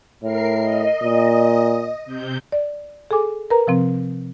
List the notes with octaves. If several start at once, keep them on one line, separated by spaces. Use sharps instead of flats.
A2 A#4 C7
D#5
A#2
C3 G6
D5
G#4 A4 G#5 D6
A#4 B4 A#5
C3 F3 C4